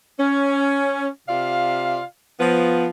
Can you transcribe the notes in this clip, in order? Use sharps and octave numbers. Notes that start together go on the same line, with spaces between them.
C#4
C3 F4 D5 F5
F3 B3